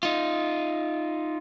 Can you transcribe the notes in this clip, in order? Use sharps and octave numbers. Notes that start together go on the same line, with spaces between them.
D#4 F4